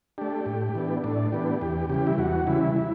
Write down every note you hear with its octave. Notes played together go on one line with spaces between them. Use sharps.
A3 D4 G4
A2
E3 B3 D4
A2 D4
E3 B3 D4 G4
E2 G4
C#3 E3 G3 G4
E4
E2 F#4
C#3 E3 G3 E4
E4